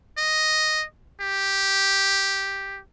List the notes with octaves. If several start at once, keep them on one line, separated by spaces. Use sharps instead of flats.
D#5
G4